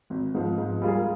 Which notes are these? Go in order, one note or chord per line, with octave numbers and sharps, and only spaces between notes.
G#1
G#2 F3
G#2
G3 A#3 F4 G#4